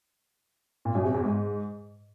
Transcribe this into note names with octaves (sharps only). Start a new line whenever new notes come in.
A#2
F#2
C3
E2
G#2